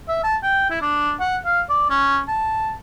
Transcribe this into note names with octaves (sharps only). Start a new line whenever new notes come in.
E5
A5
G5
E4
D4
F#5
F5
D5
C#4
A5